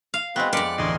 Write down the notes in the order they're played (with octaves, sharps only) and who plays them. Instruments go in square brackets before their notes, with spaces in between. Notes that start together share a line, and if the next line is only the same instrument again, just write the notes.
[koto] F5
[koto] G#3 B3 [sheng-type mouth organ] C4 F#4 B4 [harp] G5
[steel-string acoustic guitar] F2 D5 [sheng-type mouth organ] A#4 B4 C6 [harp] F6 B6 C#7
[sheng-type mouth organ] F#6
[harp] A1 D2 [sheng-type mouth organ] D#5 G#5 C6